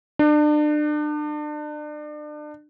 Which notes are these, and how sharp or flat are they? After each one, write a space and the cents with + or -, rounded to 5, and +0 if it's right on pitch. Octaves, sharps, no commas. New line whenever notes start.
D4 +35